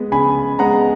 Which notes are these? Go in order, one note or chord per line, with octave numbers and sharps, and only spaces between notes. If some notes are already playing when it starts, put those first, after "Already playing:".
Already playing: G#3 B3
C#3 G#5 B5
G#3 B3 F#5 A#5